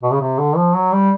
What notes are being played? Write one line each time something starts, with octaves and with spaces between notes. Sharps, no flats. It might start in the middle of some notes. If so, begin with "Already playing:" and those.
B2
C#3
C3
D3
F3
F#3
G3